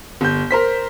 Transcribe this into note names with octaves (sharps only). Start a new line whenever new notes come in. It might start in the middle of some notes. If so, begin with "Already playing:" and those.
G1 G6
A#4 C5 B6